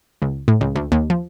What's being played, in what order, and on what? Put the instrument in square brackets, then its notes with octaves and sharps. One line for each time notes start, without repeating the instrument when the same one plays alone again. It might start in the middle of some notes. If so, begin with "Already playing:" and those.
[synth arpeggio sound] C#2
A2
C#2
D2
D#2
F3